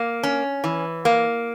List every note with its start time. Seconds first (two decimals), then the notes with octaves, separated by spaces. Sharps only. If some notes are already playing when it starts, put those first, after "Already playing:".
Already playing: A#3
0.23 C#4
0.64 E3
1.05 A#3